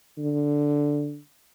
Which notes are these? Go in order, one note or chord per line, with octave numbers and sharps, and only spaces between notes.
D3